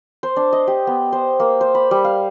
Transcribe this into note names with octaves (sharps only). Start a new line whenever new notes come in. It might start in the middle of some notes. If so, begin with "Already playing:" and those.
C5
D4
D#5
G4
B3
C5
A#3
C5
B5
G3
F5